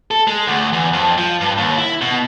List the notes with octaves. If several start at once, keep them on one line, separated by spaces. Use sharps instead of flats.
A4
G#3
D2
E2
F2
F3
G2
D#2
E4
B2